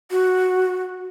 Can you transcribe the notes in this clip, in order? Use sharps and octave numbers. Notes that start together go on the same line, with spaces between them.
F#4